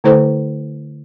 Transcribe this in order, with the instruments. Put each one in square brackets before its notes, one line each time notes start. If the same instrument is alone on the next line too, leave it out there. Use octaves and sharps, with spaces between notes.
[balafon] D3 A3 E4 A4 C5